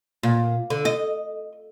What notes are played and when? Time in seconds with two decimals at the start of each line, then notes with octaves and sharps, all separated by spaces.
0.23 A#2
0.70 D3
0.85 D#5